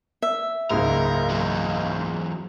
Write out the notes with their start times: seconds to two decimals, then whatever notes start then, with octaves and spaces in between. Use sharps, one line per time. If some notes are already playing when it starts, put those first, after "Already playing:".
0.22 E5
0.70 F#1 C#2 G#2 A#4
1.30 E2 F#3